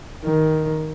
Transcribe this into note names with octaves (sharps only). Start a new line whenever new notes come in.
D#3